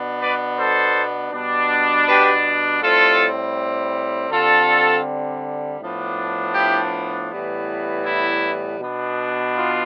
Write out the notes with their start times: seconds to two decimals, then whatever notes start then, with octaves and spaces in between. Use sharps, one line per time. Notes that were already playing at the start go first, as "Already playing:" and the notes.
Already playing: B2 B3 D4
0.20 B4 D5
0.57 A4 C5
1.32 B2 G3 B3 D4
2.06 G4 B4
2.81 A2 G3 C4 F4 A4
4.31 D3 G3 C4 F4 A4
5.81 A2 F3 B3 D4
6.55 E4 G4
7.30 A2 E3 G3 B3
8.05 E4
8.80 B2 B3 D4
9.54 F4